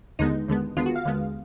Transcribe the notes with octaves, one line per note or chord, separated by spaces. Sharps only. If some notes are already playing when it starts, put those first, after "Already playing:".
D#2 D3 G#3 B3 D#4
D#2 D3 G#3 B3
D#2 D3 G#3 B3 F4
F#4
F5
D#2 D3 G#3 B3